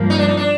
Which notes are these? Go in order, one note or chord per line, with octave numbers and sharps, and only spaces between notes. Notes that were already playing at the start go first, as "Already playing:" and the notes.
Already playing: G2 F3 A#3
D#4
D4
D#4
D4